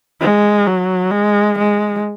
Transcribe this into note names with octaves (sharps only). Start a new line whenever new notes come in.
G#3
F#3
G#3
G#3